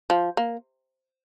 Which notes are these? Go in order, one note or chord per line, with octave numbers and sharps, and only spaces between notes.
F3
A#3